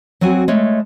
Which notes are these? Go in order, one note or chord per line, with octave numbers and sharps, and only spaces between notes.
F#3 C4 F#4 G#5
G#3 A3 C#5